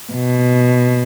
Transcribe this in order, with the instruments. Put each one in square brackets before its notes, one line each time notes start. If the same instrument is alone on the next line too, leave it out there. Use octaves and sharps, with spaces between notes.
[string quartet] B2